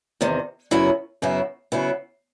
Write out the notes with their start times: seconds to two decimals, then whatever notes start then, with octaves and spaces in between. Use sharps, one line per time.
0.21 E2 C3 D#3
0.71 F#2 C#3 F#3 B3 E4
1.22 F#2 C#3 F#3 B3 E4
1.72 F#2 C#3 F#3 B3 E4